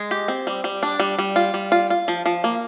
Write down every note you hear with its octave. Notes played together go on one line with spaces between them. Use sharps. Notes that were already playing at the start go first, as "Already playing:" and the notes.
Already playing: G#3
G4
C4
G3
G3
D4
G3
G3
F4
G3
F4
F4
F3
F3
A#3